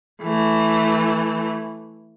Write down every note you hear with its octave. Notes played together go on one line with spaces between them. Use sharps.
E3 A3